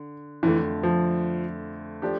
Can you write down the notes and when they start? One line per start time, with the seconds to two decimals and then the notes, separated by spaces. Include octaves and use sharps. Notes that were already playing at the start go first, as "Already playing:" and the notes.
Already playing: D3
0.43 F2 D3 E3 A3
0.83 F3
2.02 F3 A3 D4 G4